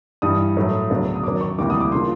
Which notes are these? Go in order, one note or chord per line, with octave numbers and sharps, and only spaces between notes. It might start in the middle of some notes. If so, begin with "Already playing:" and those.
G2 E3 G3 D#6
A2 F#3 A3
D2 C#3 F#3 B3 D4
D#6
F#2 D#3 F#3 D6
C#6
D2 C3 E3 G3 A#3 D6
D#6
D6
C#3 F3 A#3 C6